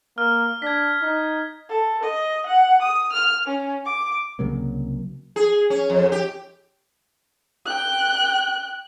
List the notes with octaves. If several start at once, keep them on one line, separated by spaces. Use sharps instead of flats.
A#3 F6
D4 G#6 B6
D#4
A4
D#5
F#5
D#6
F6
C#4
D6
C2 C#3 F#3 A#3
G#4
C#4
F2
G4
G5 F#6